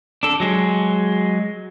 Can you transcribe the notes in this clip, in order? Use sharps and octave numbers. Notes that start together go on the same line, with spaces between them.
D4 A4
F#3 G#3